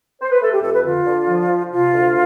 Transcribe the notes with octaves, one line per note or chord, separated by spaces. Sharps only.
C5
B4
A3 A4
G4
F2 A4
B4
D3 F4
D3
F3
F3
C3 F4
D2